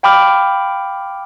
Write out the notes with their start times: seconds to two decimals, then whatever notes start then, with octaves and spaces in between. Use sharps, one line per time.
0.03 F5 G5 B5 D6 F6